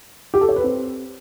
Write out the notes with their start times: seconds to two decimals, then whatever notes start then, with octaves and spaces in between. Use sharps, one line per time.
0.34 G4
0.41 A4
0.49 C#5
0.56 B4
0.64 C4